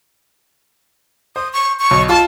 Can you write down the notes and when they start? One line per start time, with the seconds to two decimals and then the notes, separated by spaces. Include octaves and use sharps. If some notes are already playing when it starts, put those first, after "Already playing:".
1.36 C5 D#6
1.53 C#6
1.79 C#6
1.91 B1
2.09 F4 A5